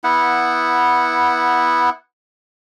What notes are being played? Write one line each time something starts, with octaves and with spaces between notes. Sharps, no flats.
B3 E4 F#5